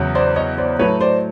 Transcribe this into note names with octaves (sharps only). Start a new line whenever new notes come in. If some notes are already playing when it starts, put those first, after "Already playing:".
Already playing: E2 C#3 F#3
C5 D5
C#5 D#5
C5 D5
A2 F#3 B4 C#5
C5 D5